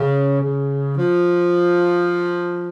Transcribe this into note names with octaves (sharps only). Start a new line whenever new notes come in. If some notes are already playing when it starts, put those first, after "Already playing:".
Already playing: C#3
C#3
F3